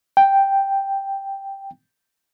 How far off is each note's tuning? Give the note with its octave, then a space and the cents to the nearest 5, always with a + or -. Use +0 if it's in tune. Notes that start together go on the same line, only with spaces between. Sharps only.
G5 +0